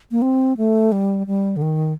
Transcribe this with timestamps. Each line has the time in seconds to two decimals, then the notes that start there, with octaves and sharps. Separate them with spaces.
0.11 A#3
0.22 C4
0.57 A3
0.92 G3
1.27 G3
1.57 D3
1.62 D#3